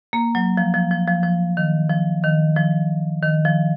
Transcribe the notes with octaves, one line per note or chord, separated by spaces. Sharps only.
A#3
F#3
F3
F3
F3
F3
F3
D#3
F3
D#3
F3
D#3
F3